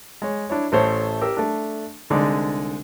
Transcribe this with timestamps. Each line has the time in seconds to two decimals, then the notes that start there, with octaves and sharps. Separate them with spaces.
0.22 G#3 C#5
0.50 D4 E4 C#5
0.72 A1 A3 C5 C#5
1.21 G4 A#4 E6
1.37 A3 D4
2.10 C2 D3 G#3 D#4 D5 D#6